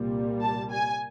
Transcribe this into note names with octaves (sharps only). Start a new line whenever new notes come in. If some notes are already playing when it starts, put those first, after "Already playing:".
Already playing: C2 A#2 G3 A#3
A5
G#5